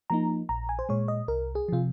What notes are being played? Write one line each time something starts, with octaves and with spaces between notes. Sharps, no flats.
F3 A#3 D#4 A#5
A#1 A#5
G#5
C5
A#2 G#3 C#5
D#5
C2 A#4
G#4
C3 F3 F4